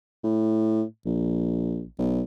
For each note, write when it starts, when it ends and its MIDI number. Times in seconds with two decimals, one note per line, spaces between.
0.24 0.83 45
1.05 1.85 34
1.98 2.22 35